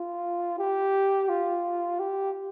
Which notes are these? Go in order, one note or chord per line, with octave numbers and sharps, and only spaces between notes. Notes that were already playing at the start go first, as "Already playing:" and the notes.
Already playing: F4
G4
F4
G4